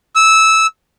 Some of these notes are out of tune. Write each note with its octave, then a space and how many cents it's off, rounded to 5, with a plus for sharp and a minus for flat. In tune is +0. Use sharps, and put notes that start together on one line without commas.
E6 -15